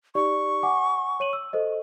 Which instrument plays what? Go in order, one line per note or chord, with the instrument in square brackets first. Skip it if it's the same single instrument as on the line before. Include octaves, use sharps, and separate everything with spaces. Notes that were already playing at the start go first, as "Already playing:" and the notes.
[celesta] D#4 G4 D5 [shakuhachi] C#6
[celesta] F#5 G#5 D6
C#5 D#7 F#7
E6
A4 C5 D#5